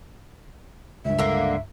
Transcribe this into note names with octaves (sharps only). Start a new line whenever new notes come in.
C#2 G2 E5
D3 A#3